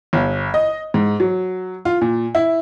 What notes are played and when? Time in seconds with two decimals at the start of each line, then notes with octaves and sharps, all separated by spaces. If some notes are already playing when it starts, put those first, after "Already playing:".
0.13 G1
0.54 D#5
0.94 G#2
1.20 F#3
1.85 F4
2.01 A#2
2.35 E4